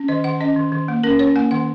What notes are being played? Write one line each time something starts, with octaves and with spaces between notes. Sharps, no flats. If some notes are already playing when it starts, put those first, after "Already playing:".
Already playing: C#4
D#3 D#5
D#3 F#5
C#4 D#5
D#3
D#3
A#3
C#4 A#4
C#4 C#5
A#3 G#5
D#3 F#5